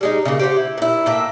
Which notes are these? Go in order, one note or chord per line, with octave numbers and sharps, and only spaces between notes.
G3 G#3 D#4
C#3 A#3
G4 C5 F#5
E4
A#2 E4
A2 A#3 E5